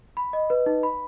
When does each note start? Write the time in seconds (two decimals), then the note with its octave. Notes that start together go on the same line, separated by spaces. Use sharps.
0.17 B5
0.33 D#5
0.50 B4
0.66 D#4
0.83 B5